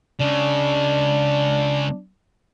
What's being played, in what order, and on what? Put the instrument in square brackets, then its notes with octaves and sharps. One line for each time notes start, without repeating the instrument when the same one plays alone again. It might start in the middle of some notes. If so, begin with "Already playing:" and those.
[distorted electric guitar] C#3 G#3 [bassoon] D4